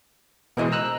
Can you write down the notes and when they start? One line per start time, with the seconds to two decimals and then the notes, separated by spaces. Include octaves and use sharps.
0.57 B2 E3 G#3 A#4 C5 D#5
0.72 A#5 E6 F#6